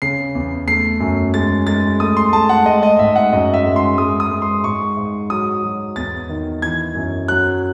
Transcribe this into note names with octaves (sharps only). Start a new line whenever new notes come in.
C#3 C7
E2
A3 C7
F#2
G#3 A6
G#3 A6
A3 D#6
C6
A3 A5
F#5
G#3 D#5
D#5
G#2 E5
F#5
F#2 D#5
E5
G#3
C6
G#3 D#6
D#6
G#3
C6
G#2 C#6
G#2
F#3 D#6
F#3
E2 A6
D#3
E3 G#6
F#2
F#3 F#6